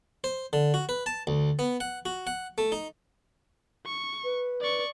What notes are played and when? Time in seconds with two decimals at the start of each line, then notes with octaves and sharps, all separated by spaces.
0.24 C5
0.53 D3
0.74 F#4
0.89 B4
1.06 A5
1.27 D2
1.59 B3
1.80 F#5
2.06 F#4
2.27 F#5
2.58 A3
2.72 D#4
3.86 C#6
4.24 B4
4.61 D5 C#6